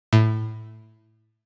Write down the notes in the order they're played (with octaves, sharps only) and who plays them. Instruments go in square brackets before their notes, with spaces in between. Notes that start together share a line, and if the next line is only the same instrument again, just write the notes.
[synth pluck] A2